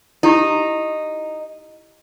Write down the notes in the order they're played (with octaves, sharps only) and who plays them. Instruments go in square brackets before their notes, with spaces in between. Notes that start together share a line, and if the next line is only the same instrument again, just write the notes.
[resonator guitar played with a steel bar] D#4 [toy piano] E4 G4